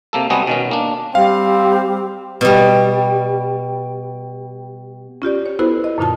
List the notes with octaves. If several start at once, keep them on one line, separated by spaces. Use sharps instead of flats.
C3 A#3 A4
C3 G3 G#3 B3 F#4 G#4
B2 D#3 C#4
A#3 D4
G3 C4 F5
B2 G3
C#4 F4 G4 D5
C#5
B3 E4 F#4 A4 B4 C5
D#5
F#2 A#2 D3 D#4 F4 A5